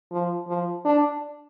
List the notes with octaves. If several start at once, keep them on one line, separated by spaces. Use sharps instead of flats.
F3
F3
D4